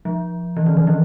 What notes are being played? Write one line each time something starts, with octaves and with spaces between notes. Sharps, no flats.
F3
E3
D#3
D#3
E3